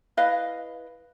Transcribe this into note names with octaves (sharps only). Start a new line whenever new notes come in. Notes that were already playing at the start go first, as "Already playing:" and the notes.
E4 B4 D#5 F5